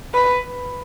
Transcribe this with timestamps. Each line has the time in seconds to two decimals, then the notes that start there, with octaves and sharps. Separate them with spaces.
0.14 B4